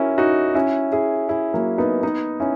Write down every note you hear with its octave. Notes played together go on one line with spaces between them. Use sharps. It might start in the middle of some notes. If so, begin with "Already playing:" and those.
Already playing: C#4 E4 F#4 A#4
D#4 F#4
C#4 E4
E4 G#4
E4 G#4
F#3 A#3
B3 D#4
B3 D#4
C#4 E4